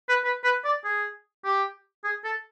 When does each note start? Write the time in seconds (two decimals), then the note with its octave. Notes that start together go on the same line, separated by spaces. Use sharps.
0.09 B4
0.24 B4
0.44 B4
0.64 D5
0.84 G#4
1.44 G4
2.04 G#4
2.24 A4